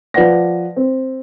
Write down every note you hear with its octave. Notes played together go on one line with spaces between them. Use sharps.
F3 B4 D5 F#5 A#6
C4